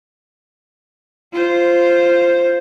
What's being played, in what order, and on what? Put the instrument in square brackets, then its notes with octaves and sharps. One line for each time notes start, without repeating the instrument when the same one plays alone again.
[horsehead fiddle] F4 C5